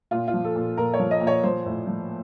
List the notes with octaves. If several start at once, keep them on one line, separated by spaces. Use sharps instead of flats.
A#2 F4
F4
F3
A4
A#2
A#2 A#4
C#5
F3
D#5
A#2
C#5
F3 C5
A2
F3